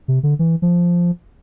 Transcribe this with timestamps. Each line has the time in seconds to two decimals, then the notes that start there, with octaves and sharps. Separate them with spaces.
0.08 C3
0.23 D3
0.39 E3
0.62 F3